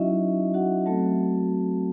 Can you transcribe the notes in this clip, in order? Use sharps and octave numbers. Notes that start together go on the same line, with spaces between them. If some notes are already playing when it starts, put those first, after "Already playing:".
Already playing: F#3 C#4 D#4 E4 F#4 D#5 E5
F#4 F#5
F#3 A3 C4 F#4 A4 A5